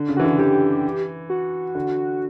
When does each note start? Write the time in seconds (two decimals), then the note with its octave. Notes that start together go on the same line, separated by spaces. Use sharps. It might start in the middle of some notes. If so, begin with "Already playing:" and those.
Already playing: D3
0.09 C#3
0.17 E3 F#4
0.24 D3
0.38 E3 G4
1.30 F#4
1.75 D3